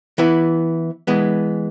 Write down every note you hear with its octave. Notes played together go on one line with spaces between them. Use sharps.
E3 B3 E4 B4
E3 G#3 B3